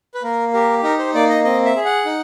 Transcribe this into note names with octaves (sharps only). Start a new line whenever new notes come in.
B4
A#3 A#4
G4 A#4
D#4 A#4
C5
A#3 D5
D#5
C4 D#5
E5
G#4
F#5
D#4